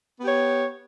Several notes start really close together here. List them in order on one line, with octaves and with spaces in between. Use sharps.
B3 G4 C#5